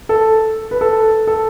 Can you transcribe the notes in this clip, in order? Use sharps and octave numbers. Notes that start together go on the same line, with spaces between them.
A4
B4
A4
A4